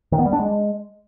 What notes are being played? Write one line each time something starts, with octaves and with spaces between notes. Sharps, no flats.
D#3
B3
G3
D4
G#3